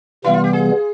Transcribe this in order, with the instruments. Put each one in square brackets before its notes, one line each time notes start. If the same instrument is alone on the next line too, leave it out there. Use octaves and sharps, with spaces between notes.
[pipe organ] C3 E3 G3 B3 [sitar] E4
[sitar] F4
G4
G#4